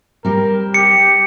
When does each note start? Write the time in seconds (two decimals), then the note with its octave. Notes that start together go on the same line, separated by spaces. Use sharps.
0.25 G3 C4 A#4
0.74 G4 C#7